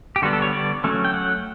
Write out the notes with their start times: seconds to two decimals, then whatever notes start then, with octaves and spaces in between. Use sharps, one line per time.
0.16 G4
0.22 D3 G3 B3 F#4
0.33 A4
0.42 C#5
0.53 D5
0.84 F#3 A3 C#4
1.04 G5
1.14 F#5